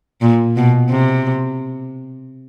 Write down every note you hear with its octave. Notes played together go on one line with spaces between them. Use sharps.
A#2
B2
C3